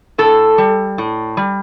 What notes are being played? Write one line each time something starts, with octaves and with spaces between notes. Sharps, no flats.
A2 A4
G3
A2
G3